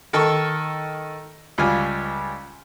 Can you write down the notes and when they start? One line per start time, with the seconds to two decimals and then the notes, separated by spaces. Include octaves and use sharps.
0.13 D#3 A4 C#6 E6
1.58 C#2 G3 F4 G#5